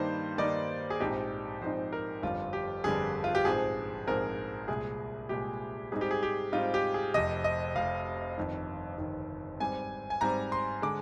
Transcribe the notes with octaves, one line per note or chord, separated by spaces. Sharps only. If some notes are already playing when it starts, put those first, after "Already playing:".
Already playing: G2 D#3 G3 A#3 D#4 C5
G2 D#3 G3 A#3 D#4 D5
G#4
A#1 G#2 F3 C4 D#4 G4
A#1 G#2 F3 C4 D#4 C5
A#4
G1 F2 D3 G3 F4
G4
G1 F2 D3 G3 G#4
F4
G4
A#1 G#2 F3 C4 G#4
A#1 G#2 F3 C4 A#4
C2 A#2 G#3 G#4
C2 A#2 G#3 G4
G#2 G3 C4 D#4 G#4
G4
G#4
G4
G#2 G3 C4 D#4 F4
G4
G#4
F1 F2 C3 D#5
D#5
F1 F2 C3 F5
G1 F2 D#3
G1 F2 D#3
G#2 G3 C4 G#5
G#5
G#2 G3 C4 A#5
C6
D3 G#3 D6